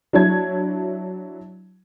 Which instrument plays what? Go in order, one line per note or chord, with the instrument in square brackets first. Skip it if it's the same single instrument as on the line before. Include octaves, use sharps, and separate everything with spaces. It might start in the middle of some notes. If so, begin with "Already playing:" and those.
[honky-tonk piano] F#3 D4 E4 C#5 A5 G#6